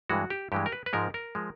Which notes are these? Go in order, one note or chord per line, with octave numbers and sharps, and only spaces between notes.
G2 E3 G#3 F#4
G4
G2 E3 G#3 G4
A#4
B4
B4
G#2 F3 G#3 A#4
A#4
F3 G#3